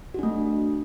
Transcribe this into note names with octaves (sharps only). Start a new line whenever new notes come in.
A3 D4 F#4